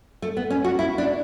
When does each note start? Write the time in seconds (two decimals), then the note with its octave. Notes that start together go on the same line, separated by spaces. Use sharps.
0.22 A3
0.37 B3
0.50 C#4
0.64 F#4
0.79 E4
0.98 D4